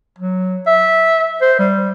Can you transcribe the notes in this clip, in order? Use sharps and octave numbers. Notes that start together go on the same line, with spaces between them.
F#3
E5
C5
G3